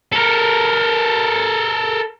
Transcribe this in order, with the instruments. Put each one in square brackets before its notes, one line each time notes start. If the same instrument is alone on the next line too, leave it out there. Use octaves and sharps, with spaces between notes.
[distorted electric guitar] A4 A#4